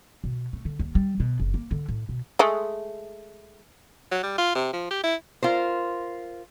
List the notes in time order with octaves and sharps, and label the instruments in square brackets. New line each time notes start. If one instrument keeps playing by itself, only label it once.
[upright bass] B2
A3
D3
D#2
G3
B2
F#1
A#3
D3
A2
B2
[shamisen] G#3 A3
[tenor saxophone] F#3
G3
F4
C3
F3
G4
E4
[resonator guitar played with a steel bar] F4 A#4 C5